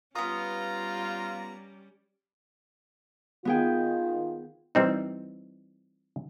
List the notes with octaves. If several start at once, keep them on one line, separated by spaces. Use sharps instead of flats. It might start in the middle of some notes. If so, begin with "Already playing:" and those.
G3 B3 C#4 F4 A#5 D#6
D#3 B3 F4 G#4 G5
E3 G3 C4 D#4